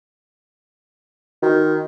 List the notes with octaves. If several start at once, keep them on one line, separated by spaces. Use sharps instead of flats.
D#3 F#4